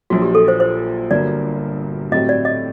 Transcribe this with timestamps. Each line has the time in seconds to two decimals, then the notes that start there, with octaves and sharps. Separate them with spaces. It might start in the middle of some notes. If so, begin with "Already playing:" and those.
0.10 A#1 A#2 F#3 F#4
0.22 G4
0.35 A4
0.48 C5
0.60 C5
1.11 G1 G2 F#3 A#3 D5
2.11 A2 F#3 C4 G4 D#5
2.29 D5
2.45 D#5